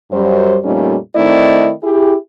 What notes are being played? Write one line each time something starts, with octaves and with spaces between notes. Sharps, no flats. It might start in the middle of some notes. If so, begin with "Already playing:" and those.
F#2 G3 C5
F2 A#2 G3 A3 C#4 D#4
D#3 A3 C4 D#4 E4 D5
E4 G4 G#4